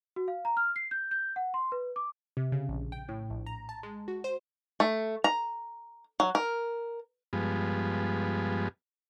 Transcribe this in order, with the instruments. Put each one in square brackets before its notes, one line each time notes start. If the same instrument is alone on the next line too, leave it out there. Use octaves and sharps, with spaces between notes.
[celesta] F#4
F5
A#5
F6
C7
G6
G6
F#5
C6
B4
D6
[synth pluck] C3
C#3
A#1
G5
A2
A#1
A#5
A5
G#3
F#4
C5
[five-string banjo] A3
A#5
F#3
A#4
[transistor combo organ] G2 F3 G#3 B3